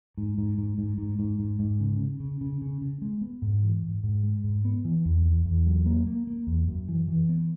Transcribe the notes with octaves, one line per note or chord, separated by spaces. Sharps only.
G#2
G#2
G#2
G#2
G#2
G#2
G#2
G#2
C#3
C#3
C#3
C#3
C#3
C#3
G#3
B3
G#2
E3
G#2
G#2
G#3
G#2
B3
E3
E2
E2
E2
F#3
A#3
A#3
A#3
E2
F#2
E3
E3
B3